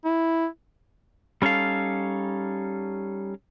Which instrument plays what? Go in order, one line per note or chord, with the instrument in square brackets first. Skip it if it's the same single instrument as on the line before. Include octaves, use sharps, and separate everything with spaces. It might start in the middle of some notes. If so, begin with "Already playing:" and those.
[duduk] E4
[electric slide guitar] G3 C#4 D#4 A4 F5